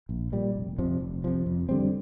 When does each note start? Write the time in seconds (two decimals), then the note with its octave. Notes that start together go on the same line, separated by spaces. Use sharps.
0.09 A#1
0.32 A#2 G3
0.55 F1
0.78 F2 C3 F3
1.00 F1
1.24 F2 C3 F3
1.46 F2
1.69 D3 G3 C4